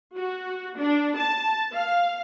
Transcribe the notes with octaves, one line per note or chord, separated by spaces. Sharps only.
F#4
D4
A5
F5